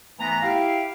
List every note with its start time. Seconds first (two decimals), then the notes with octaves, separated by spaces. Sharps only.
0.19 G#2 E3 A3 B3 A#5
0.43 E4 G4 F5